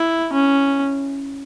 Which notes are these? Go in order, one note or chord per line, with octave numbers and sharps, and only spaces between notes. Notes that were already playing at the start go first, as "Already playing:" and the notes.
Already playing: E4
C#4